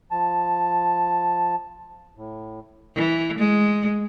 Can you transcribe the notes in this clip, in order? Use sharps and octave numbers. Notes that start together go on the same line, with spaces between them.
F3 A5
A2
E3
G#3